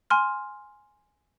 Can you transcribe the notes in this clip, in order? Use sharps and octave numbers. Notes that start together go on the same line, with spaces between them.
G#5 C6 F6